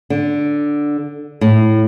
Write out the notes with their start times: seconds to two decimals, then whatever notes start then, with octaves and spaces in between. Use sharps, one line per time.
0.10 D3
1.41 A2